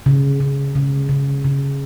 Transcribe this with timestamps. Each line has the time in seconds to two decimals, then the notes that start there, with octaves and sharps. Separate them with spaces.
0.06 C#3
0.40 C#3
0.75 C#3
1.09 C#3
1.44 C#3